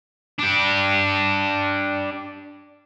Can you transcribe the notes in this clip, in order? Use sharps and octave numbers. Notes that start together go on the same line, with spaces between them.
D4 G4